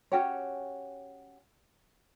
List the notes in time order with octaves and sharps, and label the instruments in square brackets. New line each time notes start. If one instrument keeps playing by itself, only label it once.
[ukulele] C#4 F#4 G4 C#5